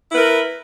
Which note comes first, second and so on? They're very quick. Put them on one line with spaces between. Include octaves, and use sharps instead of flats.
E4 B4 A#4